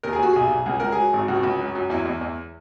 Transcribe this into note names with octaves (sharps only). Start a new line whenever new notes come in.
D#2 A#4
G#4
D#2 F#4
B1 G#4
B1
C#2 G#4
C#2 A#4
F#3 G#4
G#1
C#2 F#4
C#2
F#2
F#2
E2 E4
E2
E2